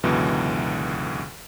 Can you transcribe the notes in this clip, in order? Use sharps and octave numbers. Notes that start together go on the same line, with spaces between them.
C#2 F#2 B2 D3 E3